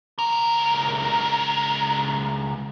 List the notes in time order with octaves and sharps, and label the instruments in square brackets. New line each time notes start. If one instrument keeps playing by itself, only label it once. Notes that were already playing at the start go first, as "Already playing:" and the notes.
[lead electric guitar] C#2 A#4